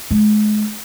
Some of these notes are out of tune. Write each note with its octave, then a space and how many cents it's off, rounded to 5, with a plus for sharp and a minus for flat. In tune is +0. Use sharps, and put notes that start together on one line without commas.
G#3 +35